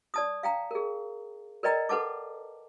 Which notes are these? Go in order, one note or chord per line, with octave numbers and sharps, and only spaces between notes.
D5 A5 D#6
F5 G5 A#5
G#4 A#4
A#4 B4 D5 D#5 G5 A#5
A4 B4 F#5 A5 D6